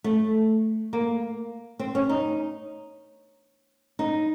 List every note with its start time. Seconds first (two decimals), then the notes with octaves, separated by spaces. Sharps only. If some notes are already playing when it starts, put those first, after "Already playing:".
0.04 A3
0.93 A#3
1.79 C4
1.95 C#4
2.09 D#4
3.99 D#4